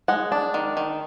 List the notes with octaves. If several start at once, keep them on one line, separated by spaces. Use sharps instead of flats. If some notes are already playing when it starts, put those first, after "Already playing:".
G#3 F#5
D4
D#3
D#3